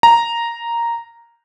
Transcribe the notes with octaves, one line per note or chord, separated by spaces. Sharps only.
A#5